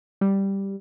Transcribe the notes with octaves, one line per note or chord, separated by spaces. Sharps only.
G3